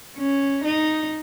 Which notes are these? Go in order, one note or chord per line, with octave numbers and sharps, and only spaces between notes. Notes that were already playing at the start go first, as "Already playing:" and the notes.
C#4
D#4